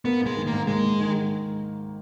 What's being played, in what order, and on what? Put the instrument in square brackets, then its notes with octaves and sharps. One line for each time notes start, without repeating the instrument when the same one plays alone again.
[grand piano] A#3 [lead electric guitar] B3
[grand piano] G#2 [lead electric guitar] G#3
[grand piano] D#3
[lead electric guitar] A#3
[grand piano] G#2
[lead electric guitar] G#3 [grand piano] A#3
[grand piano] G#2
D#3
G#2